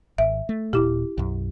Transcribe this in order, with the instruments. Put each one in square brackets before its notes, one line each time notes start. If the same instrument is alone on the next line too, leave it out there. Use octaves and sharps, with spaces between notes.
[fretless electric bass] G#1 [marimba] E5
[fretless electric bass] A3
[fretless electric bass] D#1 A#2 [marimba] E4 G4
[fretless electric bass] B1 F#2